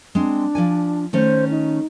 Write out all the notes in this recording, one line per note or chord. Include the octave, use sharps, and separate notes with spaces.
G#3 C4 D4
F3 D5 G#5
D#3 A3 C#4 C5
D#4